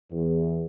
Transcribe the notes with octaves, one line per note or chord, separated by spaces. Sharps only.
E2